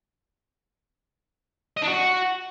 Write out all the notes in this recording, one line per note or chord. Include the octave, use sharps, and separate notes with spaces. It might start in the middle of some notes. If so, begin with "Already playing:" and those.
D#5
D4
F#4